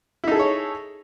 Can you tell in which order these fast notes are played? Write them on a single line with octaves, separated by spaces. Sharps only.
E4 D#4 A4 G#4 C#5